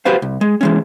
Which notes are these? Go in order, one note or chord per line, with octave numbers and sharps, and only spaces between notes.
F#4 G4 B4 C5 F5
C2
G#3
E3 G#3 C#4